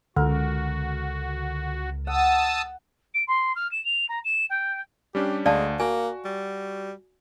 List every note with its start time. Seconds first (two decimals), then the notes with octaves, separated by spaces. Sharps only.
0.16 C#2 D3 F#4 A#4
2.07 F#5 A5 D#6 E6
3.14 D7
3.27 C6
3.56 F6
3.71 E7
3.85 F7
4.09 A#5
4.24 E7
4.50 G5
5.15 G3 C#4 D4 G4
5.46 D2 G#3 D5 F5 A5
5.80 A#3 F#4 G#5
6.25 G3